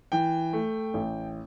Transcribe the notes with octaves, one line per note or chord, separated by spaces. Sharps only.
E3 G5
A3
A1